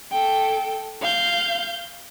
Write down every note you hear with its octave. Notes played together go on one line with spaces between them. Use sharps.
A4 G5
F5 G6